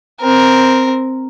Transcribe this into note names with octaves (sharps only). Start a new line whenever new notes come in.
C4 A#4